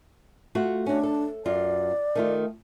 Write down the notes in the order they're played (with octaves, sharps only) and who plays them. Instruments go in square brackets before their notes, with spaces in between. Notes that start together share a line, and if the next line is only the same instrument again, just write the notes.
[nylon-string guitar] A3 F4 F#4
[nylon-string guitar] C#4 F#4 [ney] D4
[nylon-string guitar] A4
[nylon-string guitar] F#2 F4 [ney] D5
[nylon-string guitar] D#3 A3 F4